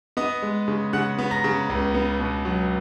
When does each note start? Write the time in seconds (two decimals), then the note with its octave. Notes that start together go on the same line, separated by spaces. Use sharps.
0.17 B3 D#5 D#6
0.42 G#3
0.68 C#3
0.93 C#3 F#5 F#6
1.18 B3
1.31 A#5 A#6
1.44 C#3
1.69 C#2
1.94 B3
2.19 B2
2.45 F#3